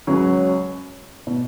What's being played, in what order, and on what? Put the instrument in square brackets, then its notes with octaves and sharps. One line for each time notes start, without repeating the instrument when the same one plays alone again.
[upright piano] C#2 C#3 F#3 C#4
B2